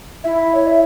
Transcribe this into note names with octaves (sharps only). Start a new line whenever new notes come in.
E4 E5
C#5
E5